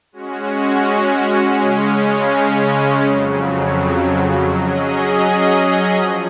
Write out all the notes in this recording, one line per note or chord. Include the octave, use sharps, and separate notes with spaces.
G#3 C#4 F#4
C#3 G#3 C#4
F2 C#3 F#3
F#3 C#4 G#4 D#5
F3